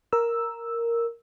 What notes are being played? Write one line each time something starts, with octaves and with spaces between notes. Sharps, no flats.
A#4 E6